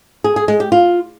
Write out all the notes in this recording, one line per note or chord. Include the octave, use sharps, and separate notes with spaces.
G#4
G#4
G#3
G4
F4